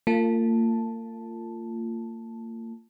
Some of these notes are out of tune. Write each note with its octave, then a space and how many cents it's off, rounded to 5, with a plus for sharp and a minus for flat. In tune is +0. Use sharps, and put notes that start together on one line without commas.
A#3 -40 F4 -10 A5 +0